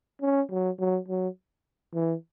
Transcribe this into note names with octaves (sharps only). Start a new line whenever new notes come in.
C#4
F#3
F#3
F#3
E3